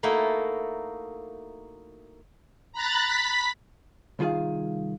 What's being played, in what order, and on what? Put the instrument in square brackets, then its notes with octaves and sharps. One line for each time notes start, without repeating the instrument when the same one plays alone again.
[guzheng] A3 A#3 D#4 E4 F#4 A4
[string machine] A#5 B5 F#6 A6
B5 B6
[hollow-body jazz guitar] C2 D#3 F4 G#4 F5